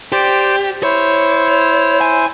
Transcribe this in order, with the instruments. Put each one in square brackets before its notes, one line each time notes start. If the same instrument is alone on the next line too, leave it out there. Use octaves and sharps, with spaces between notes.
[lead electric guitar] G4 [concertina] C5 D5
[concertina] E4 C5 [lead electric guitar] C#5
[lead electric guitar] G#5